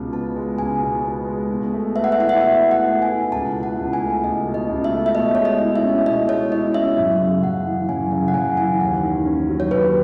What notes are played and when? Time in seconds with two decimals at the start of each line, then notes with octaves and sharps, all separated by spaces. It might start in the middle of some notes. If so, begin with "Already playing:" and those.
Already playing: C#2 B2
0.13 B3 A5
0.36 G#3
0.58 C#2 G#5
0.81 B2
1.04 B3
1.27 G#3
1.50 B2
1.73 A3
1.96 B4 E5
2.04 F#5
2.12 E5
2.18 E4 F#5
2.29 E5
2.41 B2 E5
2.64 A3
2.71 F#5
2.87 B4
3.02 G#5
3.10 E4
3.32 C#2 A5
3.55 B2
3.63 F#5
3.78 C#2
3.93 G#5
4.01 A3
4.23 C#2 D#5
4.47 B2
4.54 D#5
4.69 C#2
4.84 E5
4.92 A3
5.06 E5
5.15 B2 D#5
5.35 G#3 C#5
5.45 D#5
5.60 E4
5.76 E5
5.84 C#4
6.06 B2 D#5
6.29 G#3 C#5
6.52 E4 D#5
6.74 C#4 E5
6.97 F#2
7.20 C#3
7.43 F#2 F#5
7.66 E3
7.89 F#2 G#5
8.12 C#3 G#5
8.28 F#5
8.34 F#2 G#5
8.57 E3 G#5
8.80 D#2 F#5
9.03 D#3
9.25 C#4
9.49 F#3
9.60 C#5
9.71 D#2 B4